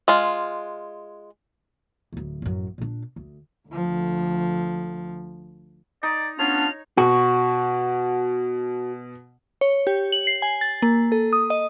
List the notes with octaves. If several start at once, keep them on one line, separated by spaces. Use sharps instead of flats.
G#3 F4
D1 D2
A1 F#2
A#2 D4
D2
D2 F3
D#4 D5
B3 C#4 D4 F4 C#5 F7
B2 F#4
C#5
G4
F#7
C7
G#5
A6
A#3
A4
D#6
D#5